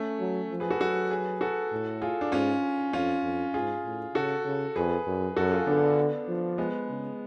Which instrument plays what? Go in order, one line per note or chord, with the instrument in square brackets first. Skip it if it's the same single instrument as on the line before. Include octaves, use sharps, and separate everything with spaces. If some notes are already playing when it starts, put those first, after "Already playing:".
Already playing: [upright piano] A3 C#4
[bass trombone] F#3
F3
[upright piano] G#4 B4
F#4 A4
[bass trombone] F#3 [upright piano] F#4 A4
[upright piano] G#4 B4
F#4 A4
[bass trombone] A2
[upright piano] F4 G#4
D4
[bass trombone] G#2 [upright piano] C#4 F4
[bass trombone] F2 [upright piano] C#4 F4
[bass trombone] F2
[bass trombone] G#2 [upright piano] F4 G#4
[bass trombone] A2
[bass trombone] C#3 [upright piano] F#4 A4
[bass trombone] C#3
[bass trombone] F2 [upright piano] G#4 B4
[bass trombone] F#2
[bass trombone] F#2 [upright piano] F#4 A4
[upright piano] F4 G#4
[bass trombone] D3 [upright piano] B3 D4
[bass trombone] F3
[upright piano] G#3 B3
[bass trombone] C#3